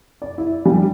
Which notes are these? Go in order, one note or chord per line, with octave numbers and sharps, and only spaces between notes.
D5
E4
G3